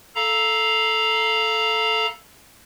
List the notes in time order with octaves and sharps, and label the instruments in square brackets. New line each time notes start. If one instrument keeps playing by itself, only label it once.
[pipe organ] A4 F5 A#5 B5